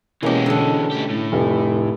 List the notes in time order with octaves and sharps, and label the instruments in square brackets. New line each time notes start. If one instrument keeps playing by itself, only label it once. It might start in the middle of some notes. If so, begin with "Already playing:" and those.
[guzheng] E2 G4 [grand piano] B2 A#3 C#4 [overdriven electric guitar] E3 G#3
[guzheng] D3 A4
[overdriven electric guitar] A3 G4
A2
[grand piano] F1